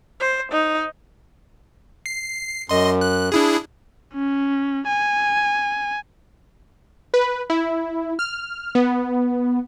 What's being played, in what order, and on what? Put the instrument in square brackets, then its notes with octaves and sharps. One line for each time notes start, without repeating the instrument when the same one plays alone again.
[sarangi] C5
D#4
[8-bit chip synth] C7
[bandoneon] F#2 [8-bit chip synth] D#5 C6
[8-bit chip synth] F#6
D4 E4 G#4
[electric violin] C#4
G#5
[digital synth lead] B4
E4
F6
B3